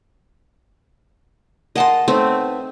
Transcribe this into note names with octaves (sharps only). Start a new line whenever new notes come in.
G#4 A#4 D#5 F#5 A5 C6
A3 B3 C4 D#4 C#5